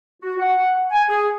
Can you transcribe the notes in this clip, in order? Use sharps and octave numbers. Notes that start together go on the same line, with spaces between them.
F#4
F#5
G#5
G#4